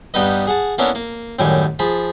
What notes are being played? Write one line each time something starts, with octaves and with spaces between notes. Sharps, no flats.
G2 G3 B3 D#4 B4 D#5
G#4 F#5 A5
A#3 B3 C#4 D4 E4 A#4
A#3
F#2 A2 D#3 G3 G#5 D6
F3 G#4 A5 B5